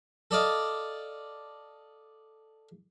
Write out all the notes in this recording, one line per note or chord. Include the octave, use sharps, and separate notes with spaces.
A4 D5 D#5 F5